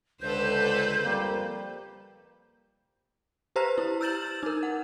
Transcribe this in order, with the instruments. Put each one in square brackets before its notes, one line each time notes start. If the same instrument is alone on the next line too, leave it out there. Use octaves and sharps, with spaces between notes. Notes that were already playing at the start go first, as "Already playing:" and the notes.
[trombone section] C#2 D3 [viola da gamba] A4 B4 C5 [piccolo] G6
[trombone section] F2 G3 A#3
[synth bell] G4 B4 C5 A#5
E4
E6 F6 G6 A6 E7 F#7
D#4 A#4
F#5